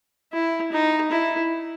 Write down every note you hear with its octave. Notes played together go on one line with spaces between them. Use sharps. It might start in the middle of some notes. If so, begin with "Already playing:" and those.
E4
D#4
E4